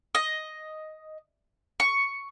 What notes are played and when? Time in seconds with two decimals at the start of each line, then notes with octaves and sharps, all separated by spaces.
0.15 D#5
1.80 C#6